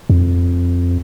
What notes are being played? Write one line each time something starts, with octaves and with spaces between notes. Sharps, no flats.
F2